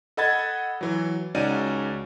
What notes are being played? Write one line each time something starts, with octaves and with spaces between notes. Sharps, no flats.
A4 D#5 F#5 B5 G#6 A6
E3 F#3
C#2 C#4 D#4 F#4 D5 D#7